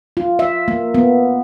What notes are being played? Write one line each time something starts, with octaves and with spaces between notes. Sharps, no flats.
F4
E5
A#3
B3